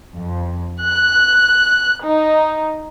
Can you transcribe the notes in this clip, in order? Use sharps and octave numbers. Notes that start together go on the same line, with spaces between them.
F2
F#6
D#4